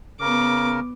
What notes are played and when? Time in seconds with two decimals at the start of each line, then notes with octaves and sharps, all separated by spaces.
0.20 C#3 B3 A#4 D6